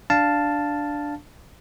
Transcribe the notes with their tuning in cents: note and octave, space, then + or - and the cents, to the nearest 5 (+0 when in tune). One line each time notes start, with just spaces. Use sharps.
D4 +0 F5 +0 A5 +0